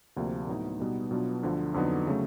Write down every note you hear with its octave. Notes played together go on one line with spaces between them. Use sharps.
D2 C3 F3 A#3 D4
A2 F#3 B3 D#4
B2 G3 B3 D#4
B2 F#3 B3 D4 F4
D2 D3 F3
F2 D3 F#3 B3 D#4
C#3 F#3 A3